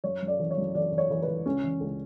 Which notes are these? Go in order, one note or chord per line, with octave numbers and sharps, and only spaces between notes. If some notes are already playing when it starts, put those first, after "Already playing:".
F#2 C#5
F#2
D5
E3
C#5
F#2
E3 D5
E3
C#5
E3
B4
E3
C#2 C#4
E3
C#2